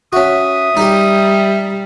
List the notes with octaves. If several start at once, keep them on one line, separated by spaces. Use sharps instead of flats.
C#4 F#4 E5 D#6
G3 D#4 G4